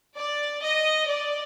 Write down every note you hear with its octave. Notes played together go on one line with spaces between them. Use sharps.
D5
D#5
D5